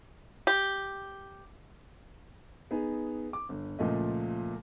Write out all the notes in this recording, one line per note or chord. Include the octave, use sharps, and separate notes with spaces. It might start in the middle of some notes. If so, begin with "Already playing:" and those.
G4
B3 D#4 G#4
D6
G1
C#2 A#2 F3 A3 D#5